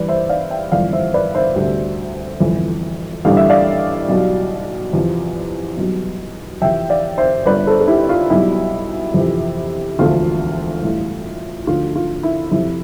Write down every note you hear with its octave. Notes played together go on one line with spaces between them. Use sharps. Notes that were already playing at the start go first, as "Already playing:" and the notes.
Already playing: A1 G2 E3 G3 B4 D5
C5 E5
D5 F5
E5 G5
G1 F2 E3 D5 F5
C5 E5
B4 D5
C5 E5
D2 C3 G3
G1 F2 E3
A1 G2 D3 G3 F5
E5
D5 F5
B1 B2 G3
E2 C3 F3
B1 B2 G3
F2 C3 E3 E5 G5
D5 F5
C5 E5
G1 G2 D3 B4 D5
A4 C5
A4
E4 G4
F4
B1 B2 G3 E4
F2 C3 E3
E1 D2 D3 F3 A3 F4
A1 A2 G3
D2 D3 F3 F4
F4
E4
F2 C3 F3 E4